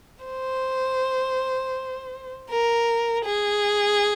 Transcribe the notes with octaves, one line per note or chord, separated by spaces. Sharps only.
C5
A#4
G#4